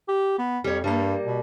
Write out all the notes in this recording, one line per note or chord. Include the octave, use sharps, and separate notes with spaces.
G4
B3
F2 G3 C#5
G2 G3 A#3
B2